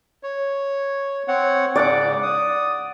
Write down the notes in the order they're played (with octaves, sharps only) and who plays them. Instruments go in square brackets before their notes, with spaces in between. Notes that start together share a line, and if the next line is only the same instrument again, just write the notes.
[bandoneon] C#5
C4 C#5 F#5
[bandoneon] G#2 C#3 [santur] D5 F#5 D6
[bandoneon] D#6